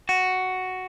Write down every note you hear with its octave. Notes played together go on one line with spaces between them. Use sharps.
F#4